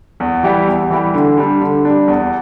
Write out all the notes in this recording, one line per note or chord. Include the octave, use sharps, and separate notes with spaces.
E2
E3 G3 E4 G4
E2
E3 G3 E4 G4
D3
G3 D4
D3
G3 D4
E2